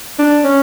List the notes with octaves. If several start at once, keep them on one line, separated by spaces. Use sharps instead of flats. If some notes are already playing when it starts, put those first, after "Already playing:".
D4
C#4